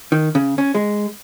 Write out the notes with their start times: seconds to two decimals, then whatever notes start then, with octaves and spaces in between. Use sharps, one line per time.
0.12 D#3
0.35 C#3
0.58 C#4
0.75 G#3